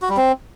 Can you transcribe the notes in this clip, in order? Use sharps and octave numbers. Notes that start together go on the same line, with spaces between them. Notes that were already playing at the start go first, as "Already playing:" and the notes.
F#4
G3
C4